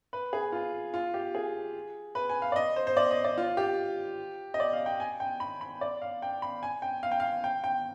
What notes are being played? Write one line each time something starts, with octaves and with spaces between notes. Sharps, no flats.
B4
G#4
F4
F4
G4
G#4
B4
G#5
F5
D5
D#5
C5
C5
D5
D#5
D5
F4
G4
D#5
D5
F5
G5
G#5
G5
B5
B5
D5
F5
G5
B5
G#5
G5
F5
G5
F5
G5
G5